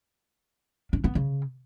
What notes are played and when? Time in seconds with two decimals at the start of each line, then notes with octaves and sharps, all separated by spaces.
0.93 D4
1.04 B3
1.15 C#3